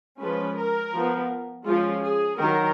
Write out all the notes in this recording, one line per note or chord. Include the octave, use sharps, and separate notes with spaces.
F3 G#3 C#4 B4
A#4
F3 B3
F3 G#3 C#4 F4
G#4
D#3 F#3 A#4